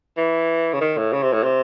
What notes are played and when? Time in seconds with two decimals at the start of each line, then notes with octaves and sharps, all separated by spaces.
0.17 E3
0.73 C#3
0.81 D#3
0.98 A2
1.13 C#3
1.23 C3
1.33 A2
1.43 C3